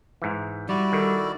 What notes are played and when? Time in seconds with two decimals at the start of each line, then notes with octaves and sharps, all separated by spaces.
0.22 G#2 E3
0.69 G3 E4 F#4 D5
0.92 D#3 A4